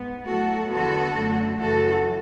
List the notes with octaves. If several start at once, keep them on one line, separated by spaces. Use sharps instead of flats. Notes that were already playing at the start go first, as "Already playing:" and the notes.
Already playing: G#2 B3
A2 F#3 A3 F#4 A4
E2 D3 G#3 B3 F#4 A4
F#2 D3 F#3 A3
F#2 C#3 E3 F#4 A4